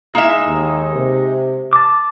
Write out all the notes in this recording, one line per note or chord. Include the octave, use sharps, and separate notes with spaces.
G#3 A#3 D#4 E4 E5
D#2
C3
A5 D6